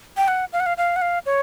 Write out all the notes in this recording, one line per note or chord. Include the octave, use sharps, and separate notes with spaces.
G5
F#5
F5
F#5
F5
F5
F#5
F5
C#5